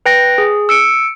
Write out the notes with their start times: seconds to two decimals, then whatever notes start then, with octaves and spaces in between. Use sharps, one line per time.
0.06 B4 G5 A#6
0.38 G#4
0.69 E6 C#7 D7